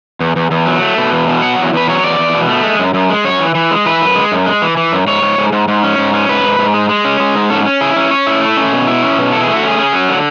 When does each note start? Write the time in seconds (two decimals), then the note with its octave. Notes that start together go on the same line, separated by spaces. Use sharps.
0.20 E2
0.36 E2
0.51 E2
0.66 F#3
0.82 A3
0.98 B2
1.13 E2
1.28 B2
1.42 F#3 F#5
1.57 E2
1.73 E2 B4
1.88 F#3 C#5
2.03 E2 D5
2.19 E2
2.34 B2
2.48 A3
2.64 G#3
2.79 F#2
2.94 F#2
3.10 G#3
3.25 F#2 C#5
3.40 E3
3.55 E3
3.71 G#3
3.86 E3 B4
4.01 F#2
4.16 G#3
4.32 F#2
4.46 G#3
4.62 E3
4.77 E3
4.92 F#2
5.07 G#2 C#5
5.22 G#2
5.38 G#2
5.52 G#2
5.68 G#2
5.83 C#4
5.98 G#2
6.14 C#4
6.29 G#2 B4
6.44 G#2
6.59 G#2
6.74 G#3
6.89 G#3
7.05 C#4
7.20 G#3
7.35 G#2
7.50 C#4 A4
7.65 C#4
7.81 E4 G#4
7.96 C#4
8.11 C#4 C#5
8.27 E4
8.41 A3
8.57 C#4
8.73 B2
8.87 E4
9.03 C#4
9.18 B2
9.32 E4 A4
9.44 A3 G#4
9.56 F#4
9.63 C#4 G#4
9.79 C#4
9.93 F#3
10.09 D3